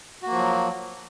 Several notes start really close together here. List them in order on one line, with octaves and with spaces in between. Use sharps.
F#4 A#3 F3 F#3